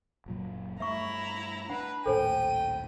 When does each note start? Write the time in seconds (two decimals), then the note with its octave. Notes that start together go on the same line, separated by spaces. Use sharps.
0.26 F#1 A#2 F#3
0.80 G2 A3 E4 E5 A#5 C#6
1.70 D4 B4 F#5
2.06 A#1 D#2 A2 A4 C5 G5 G#5 D#7